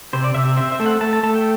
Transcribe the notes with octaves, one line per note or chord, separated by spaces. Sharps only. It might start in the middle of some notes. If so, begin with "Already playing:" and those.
C3 C5
D5
C3 E5
E5
C4 E5
E5
A3
F#5
A3 A5
A5
A3 A5
G5